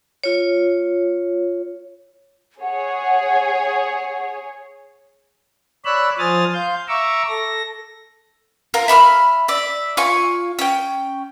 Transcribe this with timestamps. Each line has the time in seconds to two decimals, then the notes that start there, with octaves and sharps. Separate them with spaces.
0.24 F4 C#5
2.62 G#4 C#5 F#5
5.85 C#5 D5 B5 E6 F#6
6.19 F3 C5 G#5 D#6 F6 A6
6.54 F5 C6 G6
6.88 E5 A#5 C#6 D6 E6
7.29 A4 A#6
8.74 F4 A#4
8.88 E5 B5 C#6 F6
9.48 D5 E5
9.97 F4 G#5 C#6
10.59 C#4 G5